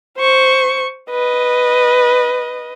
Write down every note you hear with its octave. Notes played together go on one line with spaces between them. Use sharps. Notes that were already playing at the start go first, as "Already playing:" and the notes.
C5 C#6
B4 D#5